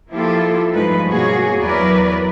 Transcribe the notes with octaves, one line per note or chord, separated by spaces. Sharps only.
F3 A#3 E4 F4 G4 A4
G2 F3 G#3 A3 D#4 B4
G2 B2 A#3 F#4 G#4 C#5
E2 F#3 E4 A#4 B4 D5